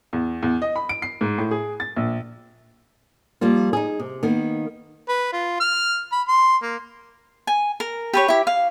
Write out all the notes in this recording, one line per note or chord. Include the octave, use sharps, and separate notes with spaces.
E2
E2
D#5
B5
D7
C7
G#2
A2
G#4
A6
A#1
F2 G3 A#3 F4
D#4 G#4
C3
D#3 A#3 B3
B4
F4
F6
B5
C6
A#3
G#5
A#4
G4 B4 C#5
E4 G4
F5